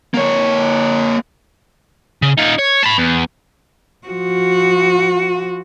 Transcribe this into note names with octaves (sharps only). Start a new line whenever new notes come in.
A#3 C#5
C#3
D#4 F4
C#5
A5 B5
E2
F3 F#4